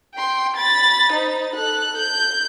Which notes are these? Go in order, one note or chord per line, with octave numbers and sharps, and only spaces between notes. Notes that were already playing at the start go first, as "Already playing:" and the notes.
G5 C6
B5 A6
D#4 C5
A4 F#6
G6